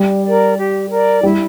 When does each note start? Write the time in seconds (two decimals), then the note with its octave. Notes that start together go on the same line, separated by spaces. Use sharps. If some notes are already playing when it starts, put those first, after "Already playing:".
Already playing: G3
0.23 A#4 D5
0.57 G4
0.89 A#4 D5
1.23 G3 E4